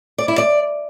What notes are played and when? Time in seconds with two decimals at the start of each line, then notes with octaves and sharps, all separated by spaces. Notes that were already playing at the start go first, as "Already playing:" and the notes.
0.18 D5
0.28 E4
0.38 D5